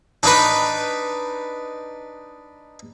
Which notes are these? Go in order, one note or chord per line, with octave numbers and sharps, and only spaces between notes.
D4 D#4 B4